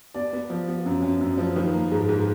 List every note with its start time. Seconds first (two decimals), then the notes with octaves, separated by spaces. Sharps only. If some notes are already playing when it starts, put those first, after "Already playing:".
0.14 B3 D5
0.33 B3
0.50 F3
0.68 B3
0.86 F#2
1.02 F#2
1.21 F#2
1.38 F3
1.56 D#3 B4
1.73 A#3
1.91 G#2
2.09 G#2